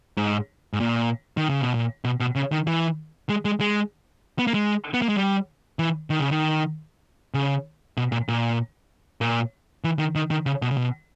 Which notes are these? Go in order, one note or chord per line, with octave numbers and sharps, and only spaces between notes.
G#2
G#2
A#2
D#3
C#3
B2
A#2
B2
B2
C#3
D#3
E3
G#3
G#3
G#3
B3
A#3
G#3
B3
A#3
G#3
G3
E3
D#3
C#3
D#3
C#3
B2
A#2
A#2
A#2
E3
D#3
D#3
D#3
C#3
B2
C#3
B2